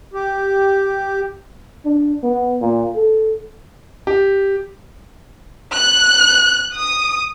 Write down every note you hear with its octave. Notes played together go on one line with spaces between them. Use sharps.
G4
D4
B3
A#2
A4
G4
F#6
D#6